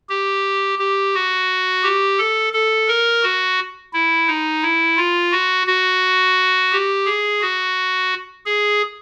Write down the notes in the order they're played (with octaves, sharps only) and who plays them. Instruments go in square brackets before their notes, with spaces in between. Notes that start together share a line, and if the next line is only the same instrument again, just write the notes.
[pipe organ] G4
G4
F#4
G4
A4
A4
A#4
F#4
E4
D#4
E4
F4
F#4
F#4
G4
G#4
F#4
G#4